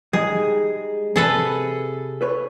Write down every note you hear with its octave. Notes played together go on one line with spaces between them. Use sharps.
G3 G#3 D#4 G#4
C3 G#4 A4 B4
A4 B4 C#5